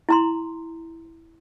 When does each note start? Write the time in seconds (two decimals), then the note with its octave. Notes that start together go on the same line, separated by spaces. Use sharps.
0.09 E4 A#5 C6